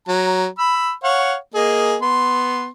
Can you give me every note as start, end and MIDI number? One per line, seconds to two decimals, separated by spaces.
0.08 0.46 54
0.08 0.46 82
0.58 0.92 83
0.58 0.92 88
1.04 1.35 73
1.04 1.35 77
1.04 1.35 78
1.55 1.96 58
1.55 1.96 68
1.55 1.96 75
2.02 2.66 59
2.02 2.66 84